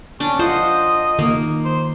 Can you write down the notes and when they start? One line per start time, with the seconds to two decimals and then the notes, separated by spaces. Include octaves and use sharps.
0.20 C#4 D4
0.39 F4 C5 D#5 F#5
1.19 D#3 A#3
1.65 C5